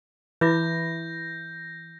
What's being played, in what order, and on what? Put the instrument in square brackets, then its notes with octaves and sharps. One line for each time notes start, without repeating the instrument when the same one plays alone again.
[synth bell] E3 [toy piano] E4 B4 D6 [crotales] G6 A#6